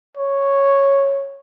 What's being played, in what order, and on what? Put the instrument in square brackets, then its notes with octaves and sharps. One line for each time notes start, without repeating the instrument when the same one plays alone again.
[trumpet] C#5